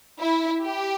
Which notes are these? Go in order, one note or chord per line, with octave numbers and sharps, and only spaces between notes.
E4
G4